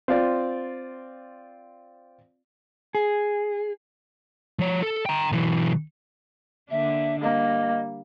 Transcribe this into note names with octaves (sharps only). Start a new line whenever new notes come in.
C4 F4 D5
G#4
F3 C#5
A4
G5 A#5
B1 E3
D3 A#3 D4 E5
G3 A#3 D#5